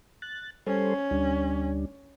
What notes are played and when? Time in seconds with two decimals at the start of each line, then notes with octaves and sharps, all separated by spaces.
0.22 F#6 A6
0.67 G3 C#4 A4 C5
1.11 D2 G3 D4